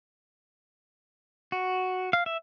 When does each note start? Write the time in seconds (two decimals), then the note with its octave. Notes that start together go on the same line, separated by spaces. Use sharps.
1.52 F#4
2.13 F5
2.26 E5